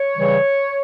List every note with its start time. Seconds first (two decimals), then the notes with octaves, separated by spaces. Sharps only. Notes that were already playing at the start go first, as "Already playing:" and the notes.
Already playing: C#5
0.16 C#3 E3 G3